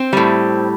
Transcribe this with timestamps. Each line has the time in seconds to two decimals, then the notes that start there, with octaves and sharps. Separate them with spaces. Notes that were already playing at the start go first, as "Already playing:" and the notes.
Already playing: C4
0.13 A2 G3